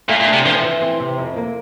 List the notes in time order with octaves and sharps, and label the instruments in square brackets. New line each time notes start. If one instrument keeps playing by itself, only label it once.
[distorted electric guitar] A#2 [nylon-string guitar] A3
[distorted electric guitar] A#2
[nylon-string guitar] D4
[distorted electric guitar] C3
[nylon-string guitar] E3 [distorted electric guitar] F3
[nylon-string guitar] E3
C4
C3
F2
A#3